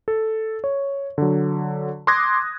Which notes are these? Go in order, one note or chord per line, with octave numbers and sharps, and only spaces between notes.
A4
C#5
D3 F#3
C6 D6 D#6 F#6 G#6 A#6